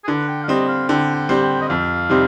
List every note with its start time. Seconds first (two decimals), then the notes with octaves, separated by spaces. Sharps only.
0.04 G#4
0.07 D3 B4
0.28 G5
0.44 F5
0.48 G3 C4 D#5
0.68 F5
0.89 D3 G5
1.15 G5
1.29 G3 C4
1.43 G5
1.61 D#5
1.69 F2 F5
2.10 C3 G3 C4 D#4